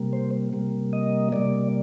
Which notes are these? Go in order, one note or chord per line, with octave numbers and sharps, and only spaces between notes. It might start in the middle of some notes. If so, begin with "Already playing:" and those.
Already playing: C3 G3 A#3
C5
C3 G3 A#3
D#5
C3 G3 A#3 D5